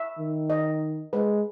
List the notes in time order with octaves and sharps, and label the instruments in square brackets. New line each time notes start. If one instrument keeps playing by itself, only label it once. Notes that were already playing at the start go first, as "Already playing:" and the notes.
Already playing: [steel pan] E5
[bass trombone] D#3
[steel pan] D#5
[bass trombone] G#3 [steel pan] B4